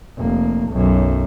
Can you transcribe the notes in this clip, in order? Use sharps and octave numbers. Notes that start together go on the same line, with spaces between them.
F1 A#3
B1 F#2